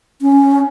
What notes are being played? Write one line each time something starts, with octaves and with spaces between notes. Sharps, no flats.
C#4